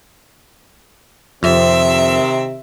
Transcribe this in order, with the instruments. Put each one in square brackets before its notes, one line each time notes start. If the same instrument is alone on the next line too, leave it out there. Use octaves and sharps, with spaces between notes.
[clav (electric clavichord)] F2 [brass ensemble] C3 D#3 C4 [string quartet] E5